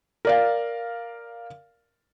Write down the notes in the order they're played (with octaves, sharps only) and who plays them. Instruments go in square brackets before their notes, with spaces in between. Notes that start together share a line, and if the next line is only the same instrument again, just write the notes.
[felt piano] A#4 D5 F5